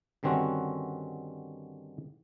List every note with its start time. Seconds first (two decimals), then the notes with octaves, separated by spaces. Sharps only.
0.23 G2 D3 D#3 C4 C#4 F#4